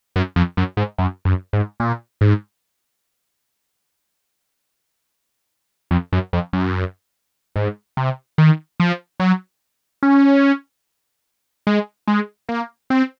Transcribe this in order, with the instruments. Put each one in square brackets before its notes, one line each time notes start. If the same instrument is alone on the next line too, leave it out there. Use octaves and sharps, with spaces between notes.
[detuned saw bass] F#2
F2
F#2
G#2
F#2
F#2
G#2
A#2
G#2
F2
F#2
F2
F#2
G#2
C3
D#3
F3
F#3
C#4
G#3
G#3
A#3
C4